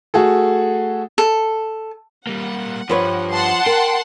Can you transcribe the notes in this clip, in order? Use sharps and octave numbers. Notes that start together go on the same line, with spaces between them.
A3 F#4 G#4 A4
A4
G3 A#3 F#5
G2 F3 B4 C#5
F#5 A5 C6
A#4 G5